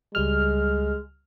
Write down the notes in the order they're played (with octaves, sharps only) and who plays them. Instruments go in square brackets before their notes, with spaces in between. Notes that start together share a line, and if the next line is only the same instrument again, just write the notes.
[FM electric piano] C#2 G3 F6 [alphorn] G#3